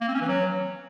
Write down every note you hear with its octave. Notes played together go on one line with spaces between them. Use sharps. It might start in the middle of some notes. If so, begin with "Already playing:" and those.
A#3
C4
C#4
E3
F#3